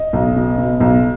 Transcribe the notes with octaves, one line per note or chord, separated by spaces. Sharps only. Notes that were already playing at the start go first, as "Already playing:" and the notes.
Already playing: D#5
B1
B2
B2
B1